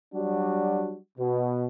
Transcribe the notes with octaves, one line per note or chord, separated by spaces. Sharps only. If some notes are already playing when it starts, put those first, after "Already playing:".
F#3 G3 D4 F#4
B2